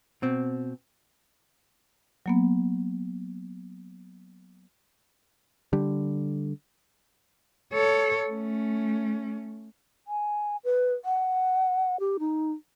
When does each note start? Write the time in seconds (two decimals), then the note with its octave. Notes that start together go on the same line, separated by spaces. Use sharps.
0.22 B2 C4
2.26 F#3 A#3 B3
5.73 D3 G3
7.73 A4 C#5
8.29 A3 C#4
10.07 G#5
10.64 B4
11.05 F#5
12.00 G4
12.19 D#4